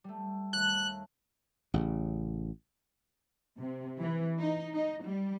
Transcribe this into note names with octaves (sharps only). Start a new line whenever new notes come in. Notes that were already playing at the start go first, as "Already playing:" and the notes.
G3 A3
D#2 A3 F#6
A1 C#3
C3
E3
D#4
D#4
G3